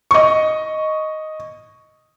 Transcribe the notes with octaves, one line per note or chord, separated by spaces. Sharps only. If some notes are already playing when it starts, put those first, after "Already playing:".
D#5 C#6